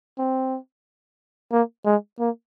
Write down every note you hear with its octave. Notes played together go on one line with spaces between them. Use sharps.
C4
A#3
G#3
A#3